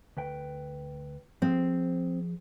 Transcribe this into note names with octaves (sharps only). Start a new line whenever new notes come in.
D2 B4 G5
F3 C4 G#4